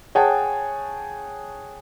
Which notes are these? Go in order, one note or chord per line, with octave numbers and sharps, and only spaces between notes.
G#4 C#5 F#5 G5 A5